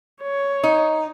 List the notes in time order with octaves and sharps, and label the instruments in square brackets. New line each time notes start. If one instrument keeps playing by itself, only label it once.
[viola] C#5
[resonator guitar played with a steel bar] D#4